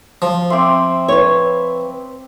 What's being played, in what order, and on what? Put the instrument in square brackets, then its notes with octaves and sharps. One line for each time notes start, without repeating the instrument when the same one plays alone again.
[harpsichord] F3
[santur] C4 C5 E5 [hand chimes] C6 D6
[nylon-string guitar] B4 C#5